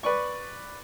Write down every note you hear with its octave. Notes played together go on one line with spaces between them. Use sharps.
B4 D5 C#6